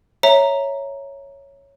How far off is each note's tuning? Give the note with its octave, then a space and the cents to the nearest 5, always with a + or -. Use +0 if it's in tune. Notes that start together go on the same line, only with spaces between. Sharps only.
C#5 +0 E5 +0 A#5 +0